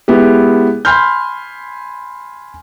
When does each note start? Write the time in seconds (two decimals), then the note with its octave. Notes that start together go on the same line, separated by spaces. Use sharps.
0.08 G#3 B3 E4 G4
0.85 G#5 B5 C6 F6 G6